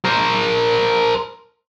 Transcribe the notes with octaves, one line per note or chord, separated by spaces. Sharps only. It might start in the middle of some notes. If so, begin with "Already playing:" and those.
A#4 C5